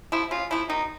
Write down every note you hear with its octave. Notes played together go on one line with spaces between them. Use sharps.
F3 A3 E4
C#3 F4
F3 A3 E4
D#3 D#4